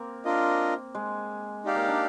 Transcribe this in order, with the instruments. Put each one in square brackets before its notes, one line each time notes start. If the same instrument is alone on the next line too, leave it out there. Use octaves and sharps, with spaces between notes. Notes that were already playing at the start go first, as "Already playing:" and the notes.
Already playing: [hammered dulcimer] A#3 C4
[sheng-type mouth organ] D4 F4 A#4 D#5
[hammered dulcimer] G#3
[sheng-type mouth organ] D#4 G4 D5 F5
[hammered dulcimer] A#3
D4